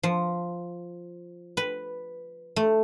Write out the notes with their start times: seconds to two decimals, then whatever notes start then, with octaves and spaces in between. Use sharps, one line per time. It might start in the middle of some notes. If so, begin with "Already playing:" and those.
0.03 F3
1.57 B4
2.56 A3